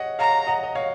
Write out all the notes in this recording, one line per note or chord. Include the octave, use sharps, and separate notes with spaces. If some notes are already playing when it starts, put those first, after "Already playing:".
Already playing: C#5 D#5 F#5
C#5 F5 A#5
D#5 F#5
D#5
C#5 F5